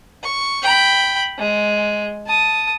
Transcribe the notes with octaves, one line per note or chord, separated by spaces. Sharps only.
C#6
G5 B5
G#3
A5 D#6